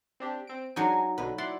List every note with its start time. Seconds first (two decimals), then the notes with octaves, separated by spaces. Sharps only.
0.20 C4 D4 G4
0.47 C4 D7
0.76 F#3 G#3 D4 D#4 G#5
1.18 B1 B2 D3 B4
1.38 E4 D5 F#5 C6